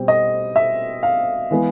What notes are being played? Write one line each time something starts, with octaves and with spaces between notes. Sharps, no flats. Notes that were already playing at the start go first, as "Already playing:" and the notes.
Already playing: B2 G3 C4
D#5
E5
F5
E3 G#3 B3